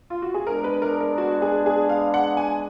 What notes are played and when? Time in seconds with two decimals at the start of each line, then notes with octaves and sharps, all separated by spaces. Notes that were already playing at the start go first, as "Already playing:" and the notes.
0.10 F4
0.22 F#4
0.34 G#4
0.46 G#3 B3 D4 A#4
0.64 B4
0.82 A#4
1.00 A#4
1.18 F#4
1.42 G#4
1.66 G#4
1.89 F5
2.14 F#5
2.37 G#5